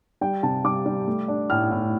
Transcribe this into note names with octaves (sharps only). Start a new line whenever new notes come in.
G3 G5
C3 A5
G3 D6
G3
A3
D4
A2 F6
A2